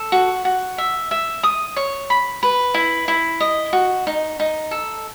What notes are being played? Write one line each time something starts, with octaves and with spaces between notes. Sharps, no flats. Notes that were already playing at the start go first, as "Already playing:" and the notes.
Already playing: A4
F#4
F#4
E5
E5
D#6
C#5
B5
B4
E4
E4
D#5
F#4
D#4
D#4
A4